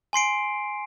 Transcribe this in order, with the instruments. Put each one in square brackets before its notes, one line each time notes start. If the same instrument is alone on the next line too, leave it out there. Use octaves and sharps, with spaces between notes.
[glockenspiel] G#5 C6 C7 D7